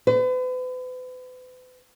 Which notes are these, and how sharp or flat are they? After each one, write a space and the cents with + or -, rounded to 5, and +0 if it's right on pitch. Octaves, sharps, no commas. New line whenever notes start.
B4 +40